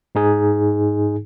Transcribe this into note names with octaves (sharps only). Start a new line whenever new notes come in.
G#2 D#4 G#4